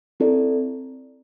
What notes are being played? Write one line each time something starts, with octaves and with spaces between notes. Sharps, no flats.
C4 E4 A4 D5